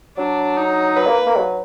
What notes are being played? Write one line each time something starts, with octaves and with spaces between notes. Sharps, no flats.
F#3 D4
D#4
F#3 B4
A#3
A#3
F#3